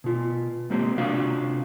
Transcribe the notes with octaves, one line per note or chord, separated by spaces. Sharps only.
B2 F4
B2 G#3 A#3 C4 G4 C5
C3 C#4 D4 F4 F#4 F5